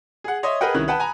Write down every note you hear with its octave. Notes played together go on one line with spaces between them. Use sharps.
G#4 F#5
C#5 D#5 E5 C6 D#6
G#4 A#4 B4 D#5 F#5 G5
C2 D#3 C#4 E4 F#6
B4 F#5 G5 A5
G#5 A#5 B5